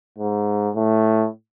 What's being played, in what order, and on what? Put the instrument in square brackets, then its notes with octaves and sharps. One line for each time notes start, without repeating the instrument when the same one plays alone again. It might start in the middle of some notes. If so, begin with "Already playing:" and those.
[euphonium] G#2
A2